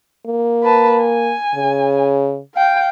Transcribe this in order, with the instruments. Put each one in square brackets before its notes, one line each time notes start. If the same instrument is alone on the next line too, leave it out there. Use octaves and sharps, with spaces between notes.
[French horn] A#3
[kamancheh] B4 A5
G#5
[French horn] C#3
[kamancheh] F5 G5